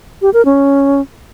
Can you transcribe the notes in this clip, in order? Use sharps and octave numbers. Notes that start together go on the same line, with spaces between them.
G4
A#4
C#4